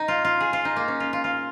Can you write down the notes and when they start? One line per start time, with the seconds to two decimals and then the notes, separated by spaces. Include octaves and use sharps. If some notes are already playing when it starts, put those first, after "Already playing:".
Already playing: D#4
0.08 F4
0.25 F4
0.40 G#4
0.53 F4
0.65 D#4
0.76 A#3
0.88 C#4
1.00 F4
1.13 F4
1.24 F4